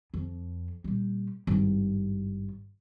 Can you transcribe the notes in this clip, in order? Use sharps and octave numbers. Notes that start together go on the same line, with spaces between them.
F2
A#2 G3
G#1 G2